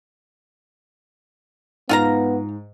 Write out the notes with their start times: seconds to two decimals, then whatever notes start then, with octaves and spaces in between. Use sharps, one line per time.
1.89 G#2 B3 F4 F5 A#5